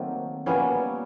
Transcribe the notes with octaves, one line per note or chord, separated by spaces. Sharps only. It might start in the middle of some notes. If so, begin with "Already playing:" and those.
Already playing: D#3 F#3 A3 A#3 C4
A#2 G3 A#3 B3 C#4